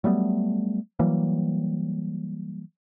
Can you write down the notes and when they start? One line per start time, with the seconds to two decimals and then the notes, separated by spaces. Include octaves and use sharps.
0.04 F#3 G3 A3 B3
0.99 E3 F#3 G3 A#3